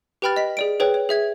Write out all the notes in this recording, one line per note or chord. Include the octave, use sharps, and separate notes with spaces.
G4 B4 G5 B5 F6 A6
D#5 B6
G#4 D5 D7
G#4 B4 C#5 G5
C#5
G#4 E5 G#6